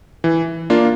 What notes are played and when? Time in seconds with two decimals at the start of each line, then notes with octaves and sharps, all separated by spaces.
0.24 E3
0.70 A#3 D4 F4